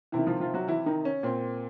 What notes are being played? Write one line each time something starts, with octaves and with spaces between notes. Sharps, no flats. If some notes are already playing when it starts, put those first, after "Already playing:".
C3 D#3 E3 E4
F3 F4
F3 F4
F#3 F#4
E3 E4
D#3 D#4
C#4
A#2 C4